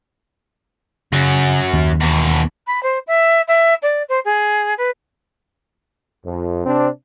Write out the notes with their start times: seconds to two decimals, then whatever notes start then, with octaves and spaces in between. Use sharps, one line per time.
1.13 F#2 C#3 F#3
1.73 D#2
2.01 E2 B2
2.67 B5
2.83 C5
3.07 E5
3.48 E5
3.82 D5
4.09 C5
4.24 G#4
4.77 B4
6.25 F2
6.66 C3 C4 D4